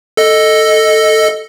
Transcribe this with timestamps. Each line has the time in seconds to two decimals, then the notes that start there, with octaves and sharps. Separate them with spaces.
0.17 A4 D#5